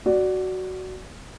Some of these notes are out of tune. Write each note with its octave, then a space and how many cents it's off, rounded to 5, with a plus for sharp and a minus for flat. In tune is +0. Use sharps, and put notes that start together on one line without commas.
F#4 +10 D5 +0